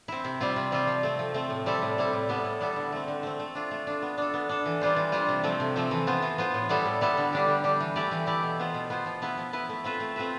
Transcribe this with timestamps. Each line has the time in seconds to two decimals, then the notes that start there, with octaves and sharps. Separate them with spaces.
0.08 C4 E4
0.25 C3
0.40 G3 C4 F4
0.56 C3
0.72 G3 C4 F4
0.87 F3
1.03 A3 C4
1.19 F3
1.34 A3 C4
1.50 A2
1.66 G3 C4 E4 A4
1.82 A2
1.98 G3 C4 E4 A4
2.13 A2
2.29 G3 B3 E4 A4
2.44 A2
2.61 G3 B3 E4 A4
2.76 D3
2.92 A3 C4
3.08 D3
3.23 A3 C4
3.39 A3
3.55 D4 F4
3.71 A3
3.87 D4 F4
4.02 B3
4.18 D4 A4
4.34 B3
4.49 D4 A4
4.66 E3
4.81 G3 D4 F4 C5
4.96 E3
5.12 G3 D4 F4 C5
5.29 C3
5.44 F3 A3 C4
5.60 C3
5.76 F3 A3 C4
5.91 E3
6.07 B3 F4 C5
6.22 E3
6.38 B3 F4 C5
6.54 A2
6.69 G3 B3 E4 A4
6.85 A2
7.01 G3 B3 E4 A4
7.17 D3
7.33 G3 D4 G4
7.48 D3
7.64 G3 D4 G4
7.80 E3
7.96 A3 E4 G4 D5
8.11 E3
8.27 A3 E4 G4 D5
8.43 B2
8.59 B3 F4 C5
8.74 B2
8.90 B3 F4 C5
9.06 F3
9.22 B3 E4 B4
9.37 F3
9.53 B3 E4 B4
9.69 A3
9.84 C4 F4 B4 E5
10.00 A3
10.16 C4 F4 B4 E5